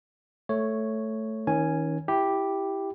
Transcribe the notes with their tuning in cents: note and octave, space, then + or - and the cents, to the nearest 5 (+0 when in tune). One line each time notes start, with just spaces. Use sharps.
A3 +0 C#5 +0
D#3 +35 C#4 +0 G#5 +0
E4 +0 G4 +0